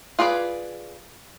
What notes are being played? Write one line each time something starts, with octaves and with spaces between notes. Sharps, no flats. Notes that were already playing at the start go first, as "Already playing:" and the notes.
F4 G#4 B4 D5